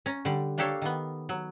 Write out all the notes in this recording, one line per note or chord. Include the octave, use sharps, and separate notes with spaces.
C#4 A#5
D3 G3
A#3 D4 G4 A4 C#5 F5
D#3 B3
F#3